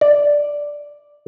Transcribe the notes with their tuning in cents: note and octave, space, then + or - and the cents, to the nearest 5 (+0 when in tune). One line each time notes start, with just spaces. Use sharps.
D5 -5